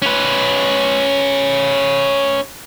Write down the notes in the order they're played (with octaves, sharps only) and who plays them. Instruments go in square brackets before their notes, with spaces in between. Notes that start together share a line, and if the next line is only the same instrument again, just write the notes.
[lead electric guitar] C#4 B4